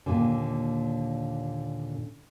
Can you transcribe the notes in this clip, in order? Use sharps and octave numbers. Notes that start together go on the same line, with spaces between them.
D#2 A#2 D3